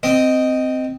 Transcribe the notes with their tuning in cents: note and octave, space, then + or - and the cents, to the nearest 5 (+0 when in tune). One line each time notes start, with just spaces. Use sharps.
C4 -10 D#5 +0